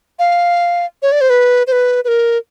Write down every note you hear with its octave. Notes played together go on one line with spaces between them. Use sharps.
F5
C#5
D5
C5
B4
C5
B4
B4
A#4